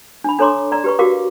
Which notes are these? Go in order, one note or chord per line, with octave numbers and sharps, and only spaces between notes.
D4 B5
D4 A4 C#5 A#5 C6 D6
D5 A#5
G4 B4 C#6
F#4 G4 A#4 F5 D6